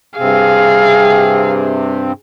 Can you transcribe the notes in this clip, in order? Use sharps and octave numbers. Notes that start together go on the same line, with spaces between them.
G2 C3 C4 G#4 F5